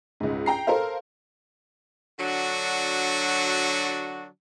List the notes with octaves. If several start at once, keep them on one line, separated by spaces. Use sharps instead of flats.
C#2 G#2
G5 A#5 C7
A4 A#4 C5 F5
D3 F#3 D4 F#4